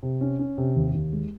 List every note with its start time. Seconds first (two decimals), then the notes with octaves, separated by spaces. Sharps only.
0.03 C3
0.21 C#4
0.39 C#4
0.58 C3
0.76 D#2
0.95 D#2
1.13 G#3